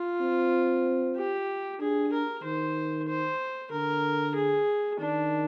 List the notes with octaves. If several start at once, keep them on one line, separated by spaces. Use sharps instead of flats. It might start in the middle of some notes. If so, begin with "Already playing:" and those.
Already playing: F4
C4
G4
D4 G#4
A#4
D#3 C5
C5
D3 A#4
G#4
D#3 D4